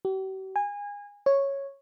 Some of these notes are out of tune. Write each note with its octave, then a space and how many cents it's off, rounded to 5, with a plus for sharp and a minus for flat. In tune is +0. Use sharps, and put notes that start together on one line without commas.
G4 -45
G#5 -25
C#5 -5